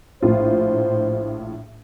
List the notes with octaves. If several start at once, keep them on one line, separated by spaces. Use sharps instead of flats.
A#1 A2 F4 C5